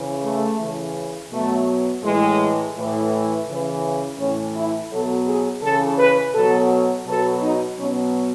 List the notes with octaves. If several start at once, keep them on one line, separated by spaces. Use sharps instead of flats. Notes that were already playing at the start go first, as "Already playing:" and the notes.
Already playing: C#3 E3
A3
C#3 E3
B2 F#3 A3
A2 E3 G#3
A2 E3
C#3 E3
A2 E3 C#4
E4
B2 F#3 A4
G#4
C#3 E3 A4
B4
B2 F#3 A4
B2 F#3 A4
D#4
B2 F#3 C#4